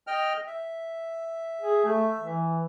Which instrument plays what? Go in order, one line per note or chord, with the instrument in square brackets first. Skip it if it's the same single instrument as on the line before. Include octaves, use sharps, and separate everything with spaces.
[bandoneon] D#5 G5 F6
E5
[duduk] G#4
A3
E3